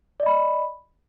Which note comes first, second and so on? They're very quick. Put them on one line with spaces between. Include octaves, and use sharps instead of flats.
D5 D#5 B5